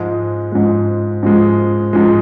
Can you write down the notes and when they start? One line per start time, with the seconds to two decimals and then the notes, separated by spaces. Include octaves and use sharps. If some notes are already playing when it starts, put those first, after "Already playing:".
Already playing: G#2 F3 G#3
0.52 G#2 F3 G#3
1.23 G#2 F3 G#3
1.93 G#2 F3 G#3